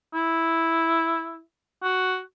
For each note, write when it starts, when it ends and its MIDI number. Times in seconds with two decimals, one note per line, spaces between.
0.14 1.41 64
1.83 2.17 66